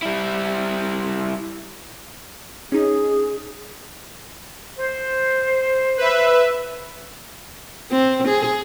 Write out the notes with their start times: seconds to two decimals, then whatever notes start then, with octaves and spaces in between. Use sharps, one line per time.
0.03 G3 E4
2.72 C#4 D#4 G#4
4.78 C5
5.97 B4 E5
7.92 C4
8.28 G#4